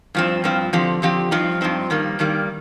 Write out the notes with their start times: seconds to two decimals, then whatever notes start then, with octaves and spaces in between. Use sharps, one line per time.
0.15 G2 F3 C4
0.44 G2 F3 C4
0.73 D3 F3 C4 G4
1.02 D3 F3 C4 G4
1.31 G2 F3 C4 D#4
1.61 G2 F3 C4 D#4
1.90 G2 D#3 G3 A#3
2.19 G2 D#3 G3 A#3